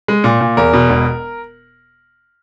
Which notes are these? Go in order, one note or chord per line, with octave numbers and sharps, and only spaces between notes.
G#3
A#2
A#2
E2 A#4
B2
E1